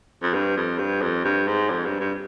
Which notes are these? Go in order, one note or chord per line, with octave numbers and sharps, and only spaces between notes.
F2
G2
F2
G2
F2
G2
G#2
F2
G2
G2